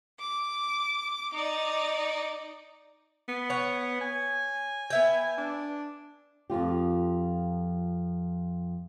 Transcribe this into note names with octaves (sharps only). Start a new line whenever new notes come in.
D6
D#4 D5
B3
C#5 F#5
G#5
B3 E5 G5
D4
F2 F3 F4 G4